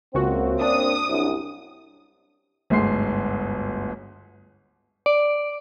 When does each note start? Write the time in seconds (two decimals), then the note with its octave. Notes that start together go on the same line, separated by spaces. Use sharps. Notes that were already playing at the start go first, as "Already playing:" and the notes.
0.15 C#2 F#2 A#3 C4 F#4
0.61 D4 D#6
1.07 C2 F#2
2.70 G1 D2 G#2 G#4 C6 C7
5.06 D5